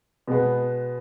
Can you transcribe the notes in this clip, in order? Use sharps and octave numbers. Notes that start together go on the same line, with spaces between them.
B2 G#3 B3